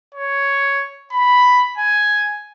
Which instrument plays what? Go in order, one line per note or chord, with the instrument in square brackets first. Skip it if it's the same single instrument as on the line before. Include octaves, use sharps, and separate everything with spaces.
[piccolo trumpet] C#5
B5
G#5